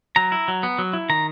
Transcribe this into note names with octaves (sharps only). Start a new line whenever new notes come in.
F#3 A#5
E4
F#3
B3
F#3
E4
D#3 A#5